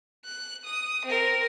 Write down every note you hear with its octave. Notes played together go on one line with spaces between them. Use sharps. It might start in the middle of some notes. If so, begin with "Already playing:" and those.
F#6
D#6
C4 A#4